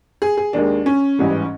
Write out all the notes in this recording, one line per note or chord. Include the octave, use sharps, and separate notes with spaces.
G#4
G#4
D#2 D#3 G#3 D4
C#4
A1 G#2 E3 G3